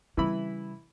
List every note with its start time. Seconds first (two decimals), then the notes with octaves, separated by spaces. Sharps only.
0.17 C#3 E3 G3 E4 B5